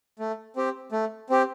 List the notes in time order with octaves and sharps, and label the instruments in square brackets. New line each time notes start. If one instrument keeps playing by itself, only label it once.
[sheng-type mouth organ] A3
C4 G4
A3
C4 G4